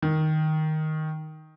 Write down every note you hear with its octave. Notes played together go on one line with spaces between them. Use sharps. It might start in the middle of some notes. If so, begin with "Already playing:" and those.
D#3